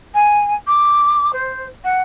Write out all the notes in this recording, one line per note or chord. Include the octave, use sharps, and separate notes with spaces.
G#5
D6
C5
F#5